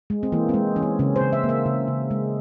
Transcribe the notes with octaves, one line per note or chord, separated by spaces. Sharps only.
G#3
C4
E3 A#3
G#3 C4
E3 C#4
C4
C#3 C#4
C5
C#3
E5
A#3
E5
C#3
C#3
G#3